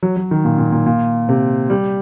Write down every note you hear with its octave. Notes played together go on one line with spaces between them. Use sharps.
F#3
F#3
D#3
A#2
A#2
A#2
A#2
C3
G3